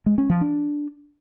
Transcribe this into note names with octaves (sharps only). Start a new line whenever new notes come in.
G#3
C#4
F3
D4